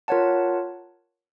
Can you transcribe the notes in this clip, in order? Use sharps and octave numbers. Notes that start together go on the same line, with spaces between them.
F4 A#4 C#5 F#5 A5